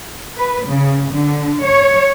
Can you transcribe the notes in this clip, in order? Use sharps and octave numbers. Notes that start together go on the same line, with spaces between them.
B4
C#3
D3
C#5